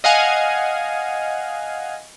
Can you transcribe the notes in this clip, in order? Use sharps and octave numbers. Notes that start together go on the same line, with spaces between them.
D#5 F5 F#5 G#5